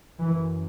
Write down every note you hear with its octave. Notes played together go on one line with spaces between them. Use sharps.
F#2 E3